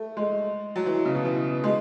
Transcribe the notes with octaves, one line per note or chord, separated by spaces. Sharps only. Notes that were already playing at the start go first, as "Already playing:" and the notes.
Already playing: A3
G#3
F#3
E3
C#3
B2
E3
G#3